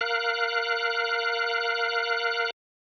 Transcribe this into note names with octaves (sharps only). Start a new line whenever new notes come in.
A#4 F5 F#6